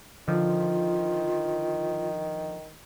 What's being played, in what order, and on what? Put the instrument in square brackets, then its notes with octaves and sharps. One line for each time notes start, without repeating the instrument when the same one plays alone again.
[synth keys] D3 F3 [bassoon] D#3 [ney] F4